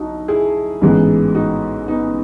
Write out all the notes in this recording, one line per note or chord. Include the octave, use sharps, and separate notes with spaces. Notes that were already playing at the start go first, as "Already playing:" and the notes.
Already playing: B1 D#4 E4 F#4
E4 G#4
A1 G#2 E3 G#3 B3
D#4 F#4
B3 D#4